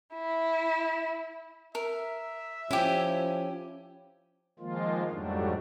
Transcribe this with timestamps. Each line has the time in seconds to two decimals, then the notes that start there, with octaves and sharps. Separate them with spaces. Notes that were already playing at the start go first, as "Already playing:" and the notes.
0.14 E4
1.75 A#4 E5
2.71 F3 C#4 E4 G4
4.59 D#3 F3 G#3 A#3 F4
5.10 F2 G#2 F#3 G3 A3 D4